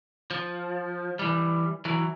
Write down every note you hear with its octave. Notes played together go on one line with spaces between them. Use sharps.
F3
E3 G3
E3 F#3